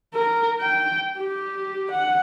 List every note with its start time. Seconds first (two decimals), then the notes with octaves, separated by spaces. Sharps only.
0.14 A#4
0.61 G5
1.18 G4
1.91 F#5